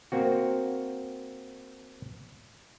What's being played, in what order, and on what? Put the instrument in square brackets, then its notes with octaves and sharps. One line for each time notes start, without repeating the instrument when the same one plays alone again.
[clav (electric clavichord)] A#3 C4 F#4